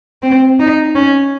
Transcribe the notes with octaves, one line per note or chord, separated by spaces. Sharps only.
C4
D#4
C#4